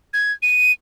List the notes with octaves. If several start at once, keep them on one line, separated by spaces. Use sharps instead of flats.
G#6
D#7